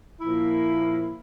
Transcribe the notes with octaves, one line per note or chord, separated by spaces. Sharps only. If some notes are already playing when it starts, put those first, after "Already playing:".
A#2 F3 A#3 E4